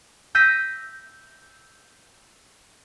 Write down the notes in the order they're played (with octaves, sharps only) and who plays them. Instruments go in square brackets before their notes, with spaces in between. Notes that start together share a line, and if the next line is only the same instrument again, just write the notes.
[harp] E6 G6 A#6 B6 D#7